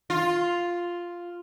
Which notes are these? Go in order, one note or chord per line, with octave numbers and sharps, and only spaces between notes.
F4